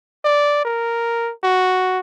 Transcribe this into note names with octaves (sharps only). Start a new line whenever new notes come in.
D5
A#4
F#4